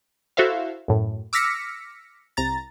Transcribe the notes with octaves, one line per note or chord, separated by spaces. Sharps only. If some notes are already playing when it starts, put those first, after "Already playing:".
E4 F#4 A4 C5 E5 F5
F#2 A2
D6 E6 F6 A#6 B6 C#7
C2 A#5 A6